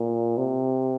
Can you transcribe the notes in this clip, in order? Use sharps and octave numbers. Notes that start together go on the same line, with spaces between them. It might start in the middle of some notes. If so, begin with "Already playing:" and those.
Already playing: A#2
C3